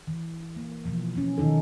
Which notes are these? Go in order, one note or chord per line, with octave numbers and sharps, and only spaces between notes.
E3
A#3
B2 E3 F3
F3 C#4
B2 D#3 D#4 A4